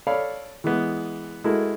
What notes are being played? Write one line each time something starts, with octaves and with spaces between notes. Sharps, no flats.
A4 C#5 D5 F5 B5
E3 G#3 B3
G#3 A3 E4 F#4 A4 A#4